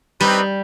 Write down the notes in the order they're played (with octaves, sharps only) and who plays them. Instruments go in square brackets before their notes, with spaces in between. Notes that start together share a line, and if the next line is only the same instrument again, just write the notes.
[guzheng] G3 [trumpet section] C4 D#4 G4 B4